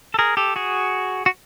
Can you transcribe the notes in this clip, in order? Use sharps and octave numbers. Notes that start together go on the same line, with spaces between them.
A4
G#4 A#4
G4 A4
F#4 G#4
F#4